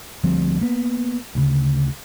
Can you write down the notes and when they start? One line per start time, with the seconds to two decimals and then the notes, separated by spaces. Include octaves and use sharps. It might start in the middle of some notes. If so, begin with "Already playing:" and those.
0.24 D2 F3 G3 C4
0.61 A#3 B3
1.35 D2 C#3